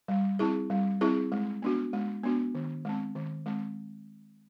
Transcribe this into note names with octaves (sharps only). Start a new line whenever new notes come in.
G3
C4 E4 G#4
G3
C4 E4 G#4
G#3
B3 D4 F#4
G#3
B3 D4 F#4
D#3
G#3 C4
D#3
G#3 C4